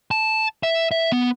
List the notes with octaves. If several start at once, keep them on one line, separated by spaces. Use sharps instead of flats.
A5
E5
E5
B3